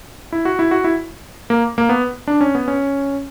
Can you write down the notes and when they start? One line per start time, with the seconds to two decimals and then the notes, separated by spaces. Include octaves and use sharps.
0.32 E4
0.45 F#4
0.59 E4
0.71 F#4
0.84 E4
1.50 A#3
1.78 A#3
1.89 B3
2.27 D4
2.41 C#4
2.55 B3
2.68 C#4